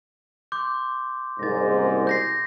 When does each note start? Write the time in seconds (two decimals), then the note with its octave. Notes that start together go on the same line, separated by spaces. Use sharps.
0.52 C6 D6 G6
1.39 F#1 C2 G#2 A6 A#6
2.07 G6 A#6 C7